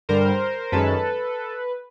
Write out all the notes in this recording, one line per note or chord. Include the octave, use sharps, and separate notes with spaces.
G2 D3 G3 A#4 C5
F#2 D#3 G#3 C#4 A4 B4